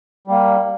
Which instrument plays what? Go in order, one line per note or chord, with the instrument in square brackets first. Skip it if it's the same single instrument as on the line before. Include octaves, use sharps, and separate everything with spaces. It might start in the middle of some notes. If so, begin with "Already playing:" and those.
[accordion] G3 A#3